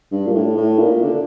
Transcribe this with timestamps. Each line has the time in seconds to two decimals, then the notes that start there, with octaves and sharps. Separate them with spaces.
0.11 G2
0.26 A#2
0.34 A2
0.57 A2
0.79 A#2
1.04 D3